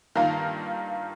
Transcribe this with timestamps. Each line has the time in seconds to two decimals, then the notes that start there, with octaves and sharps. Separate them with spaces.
0.15 G2 D#3 A#3 F4 A#4